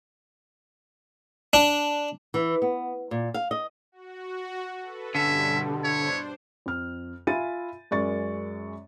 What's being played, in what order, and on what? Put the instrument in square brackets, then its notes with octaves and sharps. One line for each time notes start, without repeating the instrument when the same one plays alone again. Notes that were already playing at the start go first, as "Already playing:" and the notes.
[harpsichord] D4
[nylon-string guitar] E3
B3
A#2
F5
D#5
[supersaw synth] F#4
A4 B4
[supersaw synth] G2 B2 G3 [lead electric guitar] D3 [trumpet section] C#4 E5
[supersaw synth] D4 C5 [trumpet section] E4 C#5
[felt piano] F2 F6
F4 E5 G#5 B5 A6 D#7
F#2 G#3 A#4 D5 C#6 A6